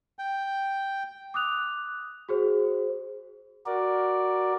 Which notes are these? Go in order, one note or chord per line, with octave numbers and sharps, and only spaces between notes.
G5
D6 D#6 F#6 F7
F#4 G#4 C5
F#4 A#4 D5